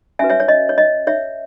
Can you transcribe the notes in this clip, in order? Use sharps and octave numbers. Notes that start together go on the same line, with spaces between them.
C#4 F#4 B4 E5 G#5
C#5 E5
C#5
D#5
C#5
D#5
C#5 E5